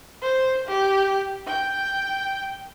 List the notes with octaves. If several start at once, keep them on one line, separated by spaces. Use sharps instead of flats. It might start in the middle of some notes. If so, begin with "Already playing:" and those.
C5
G4
G5